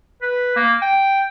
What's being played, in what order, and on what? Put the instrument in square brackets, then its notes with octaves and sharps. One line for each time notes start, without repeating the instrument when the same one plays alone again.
[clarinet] B4
A#3
G5